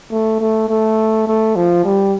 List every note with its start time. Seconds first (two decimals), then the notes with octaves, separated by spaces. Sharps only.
0.11 A3
0.40 A3
0.69 A3
1.27 A3
1.56 F3
1.84 G3